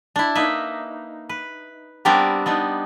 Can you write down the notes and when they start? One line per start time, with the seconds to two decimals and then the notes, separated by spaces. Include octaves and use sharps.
0.16 D4 E4
0.35 A#3 D#4 B4 E5
1.29 B4
2.05 G3 B3 C4 D4 G4 A#4
2.46 B3 D4 D#4